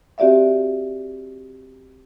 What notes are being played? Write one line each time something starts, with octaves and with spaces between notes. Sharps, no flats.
C4 F#4 G4 D5 E5 F5